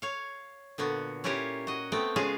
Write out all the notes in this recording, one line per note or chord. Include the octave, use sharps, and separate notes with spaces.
C#5 F5
A#2 D3 B3 F#4
C#4 E4 F4 G4 A#4 C#5
F#4 D#5
A3 B3 C4 G5
C#3 G#3 C#4 F4 G#4 F5